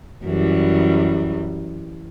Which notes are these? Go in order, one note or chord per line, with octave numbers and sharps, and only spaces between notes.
F#2 E3 G3